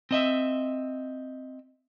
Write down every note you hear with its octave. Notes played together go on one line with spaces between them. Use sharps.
C4 D#5 E5